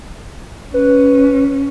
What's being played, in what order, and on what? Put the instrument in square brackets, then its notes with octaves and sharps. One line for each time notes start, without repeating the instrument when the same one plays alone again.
[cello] C#4 [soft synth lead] B4